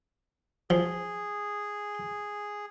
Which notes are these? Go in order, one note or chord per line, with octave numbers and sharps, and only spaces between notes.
F3 G#4